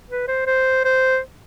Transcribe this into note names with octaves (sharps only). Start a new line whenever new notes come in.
B4
C5
C5
C5